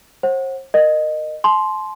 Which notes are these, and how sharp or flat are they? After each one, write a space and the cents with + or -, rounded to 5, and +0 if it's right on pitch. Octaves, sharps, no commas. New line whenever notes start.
C5 +40 F#5 +0
A#4 +0 D#5 -20
A5 -40 C6 +0